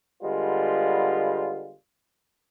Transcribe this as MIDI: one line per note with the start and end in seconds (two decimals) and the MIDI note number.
0.23 1.73 50
0.23 1.73 55
0.23 1.73 56
0.23 1.73 59
0.23 1.73 65